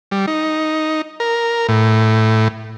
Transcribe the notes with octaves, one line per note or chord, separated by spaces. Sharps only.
G3
D#4
A#4
A2